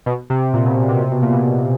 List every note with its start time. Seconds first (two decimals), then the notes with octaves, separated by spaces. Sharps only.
0.06 B2
0.30 C3
0.54 A#2
0.65 B2
0.89 C3
1.01 C3
1.11 B2
1.22 A#2
1.33 B2